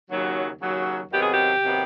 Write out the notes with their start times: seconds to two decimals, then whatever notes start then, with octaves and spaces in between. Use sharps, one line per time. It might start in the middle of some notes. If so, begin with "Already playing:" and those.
0.08 D#2 C#3 F#3
0.59 D#2 C#3 F#3
1.11 C3 D#3 F#3 B3 G4
1.21 G#4
1.31 G4
1.62 C3 D#3 F#3 B3